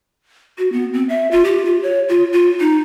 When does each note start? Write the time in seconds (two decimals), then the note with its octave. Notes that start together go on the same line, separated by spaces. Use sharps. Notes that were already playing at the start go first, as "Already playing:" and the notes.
0.58 F#4
0.72 B3
0.94 C4
1.09 E5
1.31 F4
1.45 G4
1.65 F4
1.83 C#5
2.09 F4
2.33 F4
2.60 D#4